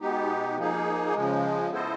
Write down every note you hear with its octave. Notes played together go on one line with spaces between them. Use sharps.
B2 G#3 B3 D#4 G4
F3 A#3 D#4 G#4
C#3 F3 G#3
B3 E4 A4 C5 D#5